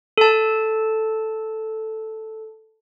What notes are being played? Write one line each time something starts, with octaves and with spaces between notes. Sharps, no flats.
A4 A5